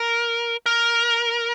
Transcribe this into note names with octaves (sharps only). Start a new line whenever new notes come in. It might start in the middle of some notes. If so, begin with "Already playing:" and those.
Already playing: A#4
A#4